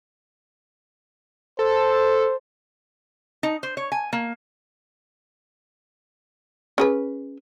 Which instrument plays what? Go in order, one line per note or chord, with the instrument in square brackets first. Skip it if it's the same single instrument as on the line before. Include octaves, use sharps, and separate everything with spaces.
[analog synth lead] A4 [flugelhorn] C5
[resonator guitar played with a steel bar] D#4
C5
C#5
G#5
A#3
[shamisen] C#4 G#4 B4